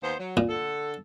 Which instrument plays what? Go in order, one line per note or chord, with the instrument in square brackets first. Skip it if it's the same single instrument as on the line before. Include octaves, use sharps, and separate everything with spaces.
[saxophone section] D#2 B3 C5
F#3
[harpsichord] A#2
[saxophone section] D3 A4